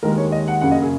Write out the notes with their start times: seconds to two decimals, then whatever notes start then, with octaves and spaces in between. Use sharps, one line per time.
0.03 D#2 D#3 G#3 A#4
0.17 C#5
0.32 D#5
0.48 F#5
0.61 F#2 C#3 A#3 F#5
0.72 D#5
0.82 G#4